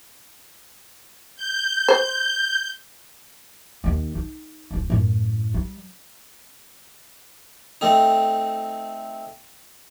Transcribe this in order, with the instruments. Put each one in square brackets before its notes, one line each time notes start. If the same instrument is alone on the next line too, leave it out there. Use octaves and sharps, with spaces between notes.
[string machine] G6
[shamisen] C5
[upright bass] D#2 D#3
D#4
D1 G3
F#2 A2
G3
[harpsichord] A3 C4 D#4